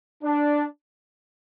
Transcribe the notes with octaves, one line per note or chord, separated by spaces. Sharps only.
D4